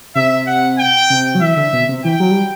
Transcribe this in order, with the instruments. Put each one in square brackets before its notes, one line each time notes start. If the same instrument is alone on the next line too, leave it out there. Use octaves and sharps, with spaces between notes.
[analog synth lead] C3 [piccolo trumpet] E5
[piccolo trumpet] F#5
G5
[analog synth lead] C3
F#3
[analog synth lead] E3 [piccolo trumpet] E5
[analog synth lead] D3
B2
C3
[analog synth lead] E3 [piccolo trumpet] G5
[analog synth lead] F#3
G3